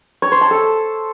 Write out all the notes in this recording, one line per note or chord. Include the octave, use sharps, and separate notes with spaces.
C#5
C5
A5
A4